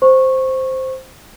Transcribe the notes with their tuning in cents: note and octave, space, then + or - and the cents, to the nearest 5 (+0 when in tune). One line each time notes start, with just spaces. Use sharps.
C5 +0 C#6 -15